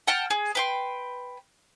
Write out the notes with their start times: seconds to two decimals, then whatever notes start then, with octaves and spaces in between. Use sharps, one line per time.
0.08 F#5 G5 A5 F6
0.30 G#4
0.55 B4 G5 C6